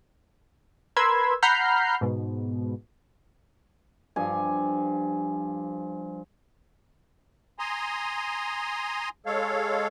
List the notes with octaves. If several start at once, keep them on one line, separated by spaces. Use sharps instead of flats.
A#4 B4 B5 C6 E6 G#6
F#5 A#5 B5 F6 G6 C7
G#2 B2
G2 F3 G#5
G#5 A#5 C6 D#6
G#3 A4 C#5 F5